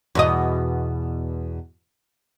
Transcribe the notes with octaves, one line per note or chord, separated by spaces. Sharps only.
E2 B2 D#5